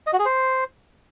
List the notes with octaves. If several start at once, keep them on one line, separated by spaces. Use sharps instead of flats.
D#5
F#4
G#4
C5